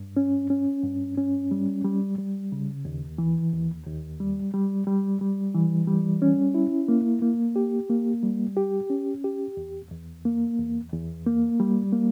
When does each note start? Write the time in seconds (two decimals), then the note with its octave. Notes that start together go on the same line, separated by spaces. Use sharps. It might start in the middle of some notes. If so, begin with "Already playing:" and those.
Already playing: G2
0.17 C#4
0.50 C#4
0.84 G2
1.18 C#4
1.51 G3
1.84 G3
2.18 G3
2.52 C#3
2.85 D#2
3.18 E3
3.53 D#2
3.87 D#2
4.20 G3
4.54 G3
4.87 G3
5.21 G3
5.55 E3
5.88 G3
6.22 C#4
6.54 E4
6.88 A#3
7.22 A#3
7.56 G4
7.89 A#3
8.23 G3
8.57 G4
8.90 C#4
9.24 G4
9.57 E2
9.91 E2
10.25 A#3
10.59 E2
10.92 E2
11.26 A#3
11.60 G3
11.92 A#3